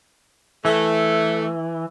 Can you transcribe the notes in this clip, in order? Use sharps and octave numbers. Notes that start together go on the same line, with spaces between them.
E3 A3